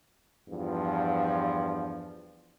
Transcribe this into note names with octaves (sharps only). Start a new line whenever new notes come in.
E2 G2 F3